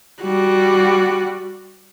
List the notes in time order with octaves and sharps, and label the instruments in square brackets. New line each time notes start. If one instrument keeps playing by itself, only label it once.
[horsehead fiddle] G3 F#4